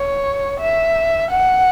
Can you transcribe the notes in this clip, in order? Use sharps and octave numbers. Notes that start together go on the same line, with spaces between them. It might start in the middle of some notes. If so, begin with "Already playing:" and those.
Already playing: C#5
E5
F#5